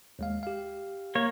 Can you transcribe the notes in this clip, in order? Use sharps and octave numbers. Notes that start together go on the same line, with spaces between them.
D#2 G#3 F5
G4 F5
A#3 C#5